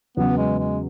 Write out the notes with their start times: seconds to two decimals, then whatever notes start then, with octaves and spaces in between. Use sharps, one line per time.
0.17 E2 C#3 F#3 B3
0.37 G#3
0.59 G#3